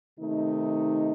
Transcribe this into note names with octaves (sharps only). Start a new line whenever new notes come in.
C3 D#3 A3 D#4